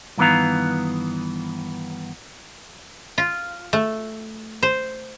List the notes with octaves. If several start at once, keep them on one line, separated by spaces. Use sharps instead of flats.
G2 D#3 E3 B3 F5 A#5
F4
A3
C5